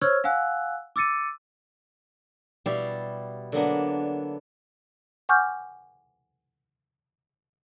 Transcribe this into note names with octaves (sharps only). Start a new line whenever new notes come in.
C5 C#5 C#6 E6 F6 G#6
F5 F#5 G#5 E6 F#6
D6 E6 A6 C#7 D#7
B2 G3 E4 G4 D5 F5
D3 F#3 A#3 B3 D4
F#5 G#5 C#6 D6 F6 G6